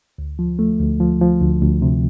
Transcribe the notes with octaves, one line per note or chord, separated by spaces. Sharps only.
D2
F3
A3
D2
F3
F3
D2
D2
C3